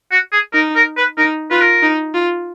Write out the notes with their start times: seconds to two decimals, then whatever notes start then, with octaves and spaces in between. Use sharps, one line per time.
0.11 F#4
0.32 G#4
0.53 D#4 A#4
0.76 A#4
0.97 B4
1.18 D#4 A#4
1.51 F4 B4
1.61 A#4
1.83 D#4
2.14 F4